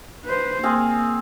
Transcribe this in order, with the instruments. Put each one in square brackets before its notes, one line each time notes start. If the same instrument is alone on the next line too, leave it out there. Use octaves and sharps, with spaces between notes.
[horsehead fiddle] B4 C5
[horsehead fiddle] A#3 [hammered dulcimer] C4 G#4 F5